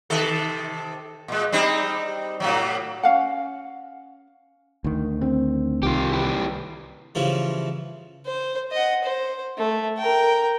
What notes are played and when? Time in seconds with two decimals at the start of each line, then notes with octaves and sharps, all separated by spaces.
0.10 C3 D#3 A4
1.28 A#2 G#3
1.52 G3 C4 D#4
2.40 A2 C3 F#3
3.03 C#4 F5 F#5
4.84 D2 D#3
5.21 C4
5.83 C2 D#3 F4 G4
6.12 E4 G4 B4
7.15 C#3 E3 F3 G3
8.26 C5
8.72 D#5 F#5
9.04 C5
9.58 A3
9.98 A#4 G5